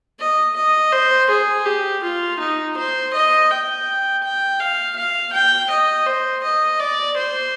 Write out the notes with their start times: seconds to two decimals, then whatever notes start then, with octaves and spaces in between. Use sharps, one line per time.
0.19 D#5
0.56 D#5
0.92 C5
1.30 G#4
1.66 G4
2.03 F4
2.39 D#4
2.77 C5
3.13 D#5
3.50 G5
4.23 G5
4.59 F5
4.96 F5
5.33 G5
5.70 D#5
6.06 C5
6.43 D#5
6.79 D5
7.16 C5